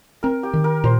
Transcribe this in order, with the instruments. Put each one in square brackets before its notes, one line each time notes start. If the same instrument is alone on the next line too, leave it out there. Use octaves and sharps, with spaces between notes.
[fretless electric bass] C4 [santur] A#4
[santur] G4
[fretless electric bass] D#3
[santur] A#4
[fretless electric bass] A#2 [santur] C5